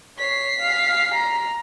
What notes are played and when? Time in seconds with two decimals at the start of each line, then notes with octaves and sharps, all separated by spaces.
0.18 C#5 B6 C7
0.59 F5
1.14 A#5